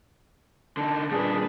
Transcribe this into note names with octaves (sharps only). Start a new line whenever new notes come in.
D3 D#4 A5
D#2 A#2 D4 G#4 B4